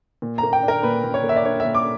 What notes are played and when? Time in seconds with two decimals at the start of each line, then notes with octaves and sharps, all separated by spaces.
0.22 A#2
0.38 A#5
0.43 A#3
0.53 G5
0.63 D4
0.68 A#4
0.83 A#2 B4
1.04 A#2
1.14 C#5
1.24 A#3
1.29 E5
1.36 D5
1.44 D4 C#5
1.60 E5
1.65 A#2
1.75 D6